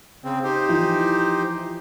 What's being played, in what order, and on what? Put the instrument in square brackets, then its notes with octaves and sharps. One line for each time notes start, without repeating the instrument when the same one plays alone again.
[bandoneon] C#3 C4
D#4 G4 C5
[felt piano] E3 F3